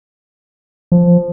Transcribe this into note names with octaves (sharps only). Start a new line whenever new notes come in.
F3